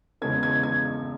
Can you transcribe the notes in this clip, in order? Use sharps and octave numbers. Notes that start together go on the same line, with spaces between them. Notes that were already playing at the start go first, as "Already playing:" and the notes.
E2 C#3 G#3 B3 G#6
G#6
G#6